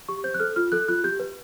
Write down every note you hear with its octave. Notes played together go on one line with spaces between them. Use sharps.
G4 C#6
C5 G6
F#6
A4 F6
F4 F6
A4 F#6
F4 F#6
G4 G6
B4